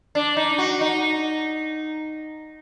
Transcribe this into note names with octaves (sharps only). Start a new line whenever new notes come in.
D4
D#4
F#4
D#4